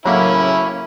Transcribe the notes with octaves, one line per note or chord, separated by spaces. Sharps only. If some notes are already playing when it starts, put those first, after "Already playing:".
A2 C#3 F#3 A#3 C#4 E4 B5